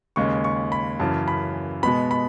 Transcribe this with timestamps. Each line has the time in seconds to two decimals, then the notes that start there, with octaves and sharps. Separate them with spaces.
0.16 D#2 C#3 G#3 C#6
0.44 C#6
0.72 B5
1.00 F#2 C#3 E3 A5
1.28 B5
1.83 B2 G#3 B3 B5
2.11 B5